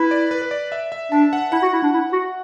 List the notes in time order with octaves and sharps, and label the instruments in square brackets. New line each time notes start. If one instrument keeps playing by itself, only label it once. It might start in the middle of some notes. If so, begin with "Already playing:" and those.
Already playing: [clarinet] E4 [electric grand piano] B4
[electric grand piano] D5
B4
B4
D5
E5
E5
[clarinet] D4 [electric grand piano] A5
[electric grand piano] F#5
[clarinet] E4 [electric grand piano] F#5
[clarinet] F#4
E4
D4
E4
F#4